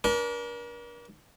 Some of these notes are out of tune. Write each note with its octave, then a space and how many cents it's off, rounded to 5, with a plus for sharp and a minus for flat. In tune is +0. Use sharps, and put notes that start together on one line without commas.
D4 -25 A#4 +40